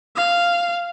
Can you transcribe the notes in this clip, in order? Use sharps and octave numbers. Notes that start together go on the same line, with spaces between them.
F5